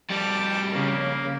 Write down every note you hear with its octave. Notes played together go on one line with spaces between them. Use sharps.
F2 G3 G4 A5 D6
C#3 A#3